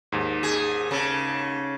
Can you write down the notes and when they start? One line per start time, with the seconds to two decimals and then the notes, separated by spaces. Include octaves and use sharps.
0.12 D#2 G#2
0.43 G#4
0.91 C#3 A4